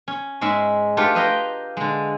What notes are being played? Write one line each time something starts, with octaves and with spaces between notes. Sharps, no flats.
C#4
G#2 G#3 C#4 E5
A3 D4 F4 G4 B4
B4 C5 D#5 F5 G5 A#5
D3 G#3